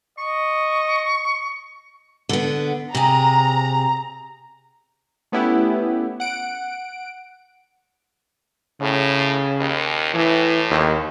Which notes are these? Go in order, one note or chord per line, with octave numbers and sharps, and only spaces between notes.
D#5 C#6
D3 B3
C3 G#4 A#5
A3 B3 C#4 E4 G4
F#5 D7
A2 C#3
D#2
A2 E3
D#2